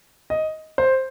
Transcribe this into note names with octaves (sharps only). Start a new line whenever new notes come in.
D#5
C5